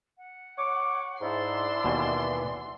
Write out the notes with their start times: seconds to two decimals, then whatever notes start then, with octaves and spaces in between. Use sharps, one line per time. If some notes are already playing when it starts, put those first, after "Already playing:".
0.18 F#5
0.57 C#5 C#6 D6
1.21 G#2 D4 E4 D5 C6
1.84 D#2 B2 E3 B3 G#5